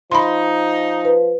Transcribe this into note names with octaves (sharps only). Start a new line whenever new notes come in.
F3 D#4 B5 C6
B4